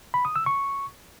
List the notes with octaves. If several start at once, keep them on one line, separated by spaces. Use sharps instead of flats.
B5
D#6
E6
C#6